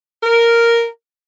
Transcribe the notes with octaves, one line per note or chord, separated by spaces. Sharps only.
A#4